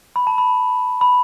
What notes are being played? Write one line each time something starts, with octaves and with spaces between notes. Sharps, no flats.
B5
A5
B5
B5